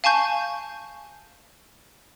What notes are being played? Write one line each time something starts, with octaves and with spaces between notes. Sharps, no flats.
F5 G#5 A5 C#6 G6